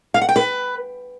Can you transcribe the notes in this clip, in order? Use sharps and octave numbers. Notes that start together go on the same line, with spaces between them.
F5
F#5
G5
B4